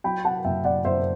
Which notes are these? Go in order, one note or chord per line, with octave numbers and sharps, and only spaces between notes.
F#3 G5 B5
F#5 A5
F#1 E5 G5
D5 F#5
F#1 C5 E5